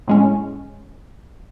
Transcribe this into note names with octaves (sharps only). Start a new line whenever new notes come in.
A2 G#3 C#4